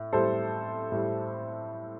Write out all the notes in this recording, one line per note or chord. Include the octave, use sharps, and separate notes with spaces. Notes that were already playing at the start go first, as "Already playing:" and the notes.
Already playing: A2
A2 G3 A4 C5
A2 G3